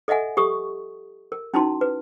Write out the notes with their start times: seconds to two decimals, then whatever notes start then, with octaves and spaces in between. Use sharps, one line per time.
0.08 A4 D#5 E5 F#5 G#5
0.37 G4 A4 C#6 D#6
1.32 A#4
1.54 C#4 D#4 E4 F#4 A5 C6
1.81 B4